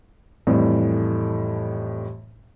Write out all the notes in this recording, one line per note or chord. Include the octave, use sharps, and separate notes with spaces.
F2 A2 E3 G3